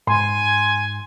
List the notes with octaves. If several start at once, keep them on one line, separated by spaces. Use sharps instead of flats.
G#2 G#5 C6